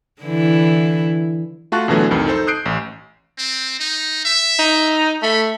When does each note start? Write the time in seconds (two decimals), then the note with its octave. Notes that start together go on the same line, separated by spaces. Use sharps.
0.22 D3 E3 E4
1.72 A3 F4 F#4 A5 C#6 F#6
1.88 E2 B2 D3 E3 F#3 A3
2.11 C2 F2 D#3
2.27 D#4 A4 C5
2.47 D#6 F#6 G6 C7 D7
2.66 A1
3.38 C4
3.80 D#4
4.25 E5
4.59 D#4
5.22 A3 B5